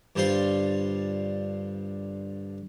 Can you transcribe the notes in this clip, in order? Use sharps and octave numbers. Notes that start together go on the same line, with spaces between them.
G2 D3 G3 F4 C5 C6